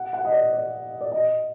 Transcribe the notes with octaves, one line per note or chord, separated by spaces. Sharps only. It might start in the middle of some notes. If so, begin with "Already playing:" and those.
Already playing: F#5
F#5
D#5
D5
D5
D5
D#5